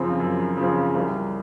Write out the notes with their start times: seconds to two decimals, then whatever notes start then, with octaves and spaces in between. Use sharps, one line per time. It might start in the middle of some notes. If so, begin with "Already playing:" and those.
Already playing: F#2 C#3 F3 C4
0.20 F#2
0.57 C#3 F3 C4
0.95 C2